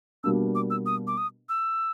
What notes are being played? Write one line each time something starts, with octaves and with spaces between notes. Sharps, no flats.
B2 G3 A#3 D4 E6
D6
E6
D#6
D6
D#6
E6